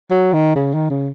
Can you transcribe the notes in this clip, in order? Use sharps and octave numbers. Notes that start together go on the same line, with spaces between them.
F#3
D#3
C#3
D#3
C#3